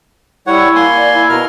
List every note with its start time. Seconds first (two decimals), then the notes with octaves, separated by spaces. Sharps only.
0.47 G3 E4 C#5 F#5
0.76 A#3 G#5 C6
0.97 D5
1.14 E4
1.29 B2 A#4 F6